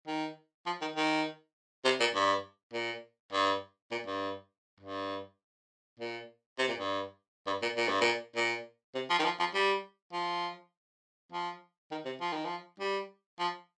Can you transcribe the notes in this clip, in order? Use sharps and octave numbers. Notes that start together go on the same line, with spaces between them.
D#3
F3
D#3
D#3
C3
A#2
G2
A#2
G2
A#2
G2
G2
A#2
C3
A#2
G2
G2
A#2
A#2
G2
A#2
A#2
C3
F3
D#3
F3
F3
G3
F3
F3
D#3
C3
F3
D#3
F3
G3
F3